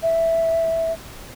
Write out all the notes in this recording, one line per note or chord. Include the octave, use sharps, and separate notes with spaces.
E5